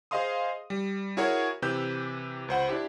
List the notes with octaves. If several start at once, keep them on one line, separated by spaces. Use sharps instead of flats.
G#4 C5 D#5 F5 C6 D#6
G3
E4 F#4 G#4 A#4 C#5
C3 E3 G4 B4 E6 G6
C#2 C5 F#5 B5
D4 E4 G4